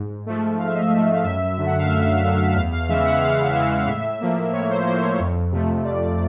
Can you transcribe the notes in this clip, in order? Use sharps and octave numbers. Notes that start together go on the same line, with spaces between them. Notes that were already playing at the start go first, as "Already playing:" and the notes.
Already playing: G#2
F3 A3
G#2 F5
E5
D#5
E5
F3 A3
F5
F#2 E5
D3 F#3 A3
F#5
F5
F#2 E5
D3 F#3 A3
E2 F5
F5
C#3 E3 G#3 E5
F#5
E2 F5
C#3 E3 G#3 E5
F5
A2 E5
F3 A#3
A2 C#5
C5
F3 A#3 C5
C#5
F2
C3 F3 A3
F2 D5